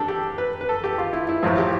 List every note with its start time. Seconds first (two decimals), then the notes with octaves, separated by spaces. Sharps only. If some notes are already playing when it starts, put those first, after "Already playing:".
Already playing: G3 D4 A4
0.08 G4
0.38 B4
0.61 B4
0.69 A4
0.84 G4
0.98 F4
1.13 E4
1.29 E4
1.43 A1 A2 F3 E4
1.58 G4